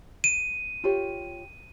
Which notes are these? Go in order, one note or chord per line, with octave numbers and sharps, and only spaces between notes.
D#7
F4 G4 C#5